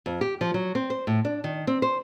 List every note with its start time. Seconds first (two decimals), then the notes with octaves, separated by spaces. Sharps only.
0.06 F2
0.21 G4
0.41 F3
0.54 F#3
0.75 C4
0.90 C5
1.07 A2
1.25 D4
1.44 D#3
1.67 C4
1.82 C5